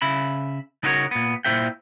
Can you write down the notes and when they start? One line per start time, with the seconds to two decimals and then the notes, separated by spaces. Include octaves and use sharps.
0.02 C#3 E5 B5
0.83 C#3 D#4 E4 F#4 A#4 C#5
1.11 A#2 B3
1.45 A#2 E4 C5 E5 G5